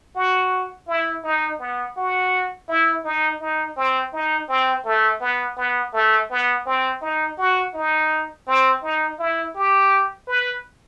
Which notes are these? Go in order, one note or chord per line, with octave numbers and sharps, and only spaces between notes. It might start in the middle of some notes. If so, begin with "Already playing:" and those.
F#4
E4
D#4
B3
F#4
E4
D#4
D#4
C4
D#4
C4
A3
B3
B3
A3
B3
C4
D#4
F#4
D#4
C4
D#4
E4
G4
B4